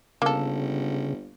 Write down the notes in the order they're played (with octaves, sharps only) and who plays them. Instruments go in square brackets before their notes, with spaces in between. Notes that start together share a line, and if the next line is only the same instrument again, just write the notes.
[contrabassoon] G1 [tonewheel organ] C#3 [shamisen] A#3 A4